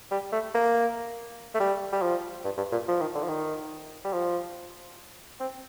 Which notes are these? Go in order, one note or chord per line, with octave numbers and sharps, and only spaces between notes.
G3
A3
A#3
A3
G3
G3
F3
G2
G2
A#2
F3
D#3
D3
F3
D#3
G3
F3
C4